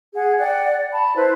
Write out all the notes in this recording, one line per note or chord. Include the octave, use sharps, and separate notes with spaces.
G#4 F#5
D5 F#5 G5
A5 B5
E4 B4 C5